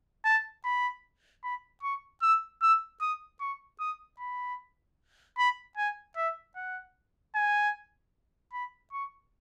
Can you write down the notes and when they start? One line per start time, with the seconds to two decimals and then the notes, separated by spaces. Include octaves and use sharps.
0.25 A5
0.64 B5
1.43 B5
1.83 C#6
2.22 E6
2.61 E6
3.01 D#6
3.40 C#6
3.80 D#6
4.19 B5
5.38 B5
5.77 G#5
6.16 E5
6.56 F#5
7.35 G#5
8.53 B5
8.93 C#6